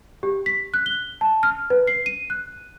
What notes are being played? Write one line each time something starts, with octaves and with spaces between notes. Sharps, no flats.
G4
B6
F#6
G7
A5
F6
B4
C7
D#7
F#6